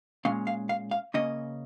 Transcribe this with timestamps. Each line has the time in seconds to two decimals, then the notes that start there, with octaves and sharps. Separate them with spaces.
0.25 A#2 G#3 C#4 F5
0.47 F5
0.69 F5
0.91 F5
1.14 C#3 A#3 C#4 D#5